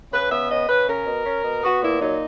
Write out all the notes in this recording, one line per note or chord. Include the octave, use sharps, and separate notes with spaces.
C#3 B4
B3 E5
C#3 D#5
C#3 B4
C#4 A#4
B2
C#4
B2
B3 F#4
A#2 E4
F#3 D#4